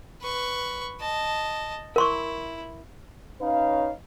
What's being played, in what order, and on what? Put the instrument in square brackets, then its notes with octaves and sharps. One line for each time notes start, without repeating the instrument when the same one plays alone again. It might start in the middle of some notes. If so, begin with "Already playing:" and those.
[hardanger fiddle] B4 C#6
D#5 A5
[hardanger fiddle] E4 [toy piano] A#4 C6 C#6
[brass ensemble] C#4 D#4 B4 C#5 F5